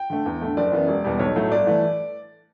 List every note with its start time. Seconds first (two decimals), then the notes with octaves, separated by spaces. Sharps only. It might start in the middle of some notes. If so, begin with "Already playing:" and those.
Already playing: G5
0.10 D3 A3
0.26 E2
0.41 D3 A3
0.57 F#1 D5
0.72 F#2 E3 B3
0.88 E1
1.04 E2 B2 G3
1.19 B1 C#5
1.36 A2 F#3 A3
1.51 G1 D5
1.67 E3 A3